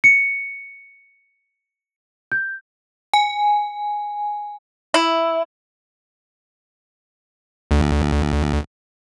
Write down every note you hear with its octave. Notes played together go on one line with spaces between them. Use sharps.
C#7
G6
G#5
E4
D2